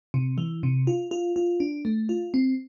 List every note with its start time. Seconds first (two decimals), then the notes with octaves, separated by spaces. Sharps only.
0.14 C3
0.38 E3
0.63 C3
0.87 F4
1.11 F4
1.36 F4
1.60 D4
1.85 A3
2.09 F4
2.34 C4